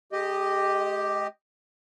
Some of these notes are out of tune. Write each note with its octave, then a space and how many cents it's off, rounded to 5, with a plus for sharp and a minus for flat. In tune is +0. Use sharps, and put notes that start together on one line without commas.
G#3 +35 G4 +0 D#5 -10